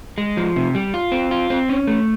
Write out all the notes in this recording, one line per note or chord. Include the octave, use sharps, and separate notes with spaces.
G#3
F3
C3
G3
F4
C4
F4
C4
C#4
A3